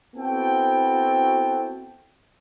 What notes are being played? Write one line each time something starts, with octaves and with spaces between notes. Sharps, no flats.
B3 C4 E4 F#4 A4 G5